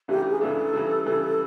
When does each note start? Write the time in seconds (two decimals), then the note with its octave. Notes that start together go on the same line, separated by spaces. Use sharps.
0.08 C#2 C#3 E3 A3 D4 G4
0.30 G#4
0.41 C#2 C#3 E3 A3 D4 A4
0.73 C#3 E3 G3
1.06 C#3 E3 G3